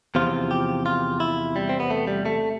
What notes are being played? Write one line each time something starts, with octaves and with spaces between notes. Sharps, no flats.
E2 C3 F3 F4
G4
F4
E4
G3
C4
B3
A3
G3
A3